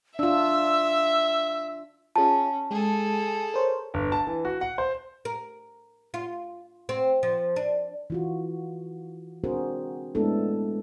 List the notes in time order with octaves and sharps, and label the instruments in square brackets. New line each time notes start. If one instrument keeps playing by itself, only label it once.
[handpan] D4 F4 [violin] E5 [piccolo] E6
[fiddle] C#4 [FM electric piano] F4 G#4 [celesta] A5
[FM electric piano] G#3 [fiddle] G#4 A4
[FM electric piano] A#4 C5 C#5
[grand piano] G1
A5
E3
F#4
F#5
C5
[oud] A#4
F4
C4
F3
D4
[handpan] E3 F4 F#4
C4 D4 F#4 G#4 A#4 C5
G#3 A3 B3 D4 E4 A4